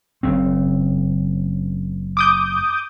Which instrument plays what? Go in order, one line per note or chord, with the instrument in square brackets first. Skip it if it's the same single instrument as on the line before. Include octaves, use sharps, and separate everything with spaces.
[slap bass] F#1 C#3 C4
[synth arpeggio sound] D6 D#6 G6